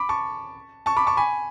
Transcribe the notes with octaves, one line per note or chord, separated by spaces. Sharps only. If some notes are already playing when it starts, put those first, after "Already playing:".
Already playing: B5 D6
A5 C#6
A5 C#6
B5 D6
A5 C#6
G#5 B5